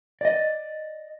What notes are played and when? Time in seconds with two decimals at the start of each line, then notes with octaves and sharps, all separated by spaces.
0.21 D5 D#5